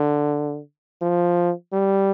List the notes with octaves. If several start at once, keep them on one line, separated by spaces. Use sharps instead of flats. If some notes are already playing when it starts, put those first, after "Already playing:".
Already playing: D3
F3
G3